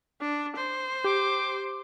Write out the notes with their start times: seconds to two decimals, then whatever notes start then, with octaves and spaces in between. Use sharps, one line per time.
0.21 D4
0.57 C5
1.04 G4 D6